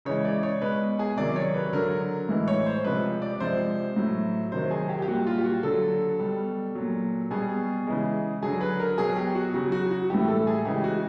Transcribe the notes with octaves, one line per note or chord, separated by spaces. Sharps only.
C#3 E3 G#3 C#5
D5
C#5
B2 G#3 B4
G#4
C3 D#3 F#3 D5
C#5
B4
D3 F#3 A#4
A2 E3 G#3
C#5
C5
C3 F3 G#3 B4
D5
C3 F3 G#3 C5
A2 F#3
C3 D#3 F#3 C5
G#4
G4
G4
A#2 G3 F#4
F4
G4
F#4
D3 F#3 A4
B2 G3
A#2 F#3
B2 G3 G#4
C#3 E3 G#3
D3 F#3 G#4
B4
A#4
B2 F#3 G#4
G4
F#4
C#3 F#3 F#4
F#4
F#4
A2 E3 G3 G4
A4
G#4
C#3 E3 G#3 G4
F#4